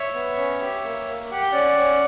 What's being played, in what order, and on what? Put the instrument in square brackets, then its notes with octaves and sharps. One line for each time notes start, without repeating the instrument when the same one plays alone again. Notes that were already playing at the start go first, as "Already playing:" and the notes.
Already playing: [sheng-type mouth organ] C#5 E5
B3
C#4
G4
A#3
A#3
G4 F#5
G5
C#4 D5 F#5
C#4